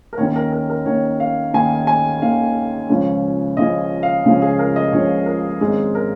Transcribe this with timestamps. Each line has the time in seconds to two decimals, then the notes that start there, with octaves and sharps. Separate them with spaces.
0.13 A#4
0.18 D#2 C#5
0.20 D#3 C#4
0.36 A#4
0.53 A#4
0.70 A#4
0.85 D#2 D#3 C#4 C#5
1.20 F5
1.53 D#2 D#3 C#4 G#5
1.87 G#5
2.22 D#2 D#3 C#4 F5
2.90 C#2 C#3 F3 C#4
3.57 C#2 C#3 F3 C#4 D#5
4.03 F5
4.24 C#2 C#3 F3 C#4
4.42 G#4
4.59 A#4
4.76 D#5
4.92 C#2 C#3 F3 C#4 C#5
5.26 A#4
5.61 G#1 G#2 G#3 C#4 G#4
5.95 A#4